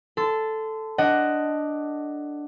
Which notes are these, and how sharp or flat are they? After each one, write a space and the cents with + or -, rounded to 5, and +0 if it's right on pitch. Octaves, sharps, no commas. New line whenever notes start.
A4 +0 C6 -30
D4 +0 D#5 +0 F#5 +10